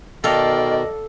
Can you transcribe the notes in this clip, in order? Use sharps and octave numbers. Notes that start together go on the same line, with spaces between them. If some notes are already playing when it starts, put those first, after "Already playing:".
B2 D#3 A4 D5 D#5 F5 G5